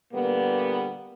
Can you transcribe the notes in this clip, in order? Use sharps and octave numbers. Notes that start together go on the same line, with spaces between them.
A#2 D3 G3 A#3 B3